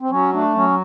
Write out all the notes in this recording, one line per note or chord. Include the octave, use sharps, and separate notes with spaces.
C4
F#3 C#4
A3 D4
F#3 C#4